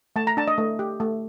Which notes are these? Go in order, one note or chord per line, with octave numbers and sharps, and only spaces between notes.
A3 A5
A#5
D4 A5
D#5
A3
G4
A3